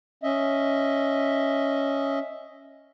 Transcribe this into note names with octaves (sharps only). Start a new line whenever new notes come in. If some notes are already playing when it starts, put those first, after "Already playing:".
C#4 D#5 E5